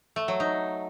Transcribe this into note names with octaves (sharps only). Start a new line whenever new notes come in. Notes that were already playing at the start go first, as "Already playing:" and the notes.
A3
F#3
D#4